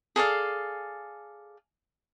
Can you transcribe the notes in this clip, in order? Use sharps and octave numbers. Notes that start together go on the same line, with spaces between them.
G#4 A4 D5 F5